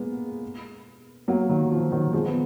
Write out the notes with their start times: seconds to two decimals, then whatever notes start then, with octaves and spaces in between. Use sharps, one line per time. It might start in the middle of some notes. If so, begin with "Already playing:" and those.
Already playing: G#3 A#3 B3
1.28 F#3 A#3
1.49 D#3 F#3
1.71 F3
1.92 D#3 F#3
2.13 F3 G#3
2.26 B3